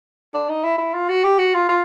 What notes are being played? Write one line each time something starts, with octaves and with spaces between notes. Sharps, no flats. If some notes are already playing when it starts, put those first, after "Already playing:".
D4
D#4
E4
E4
F4
F#4
G4
F#4
F4
F4